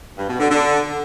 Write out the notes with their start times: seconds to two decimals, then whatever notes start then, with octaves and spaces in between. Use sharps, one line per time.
0.18 G2
0.29 B2
0.40 D3
0.51 D3